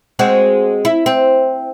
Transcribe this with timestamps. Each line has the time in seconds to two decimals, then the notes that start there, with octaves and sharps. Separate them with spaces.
0.19 G#3 C4 F#4
0.85 E4
1.06 C4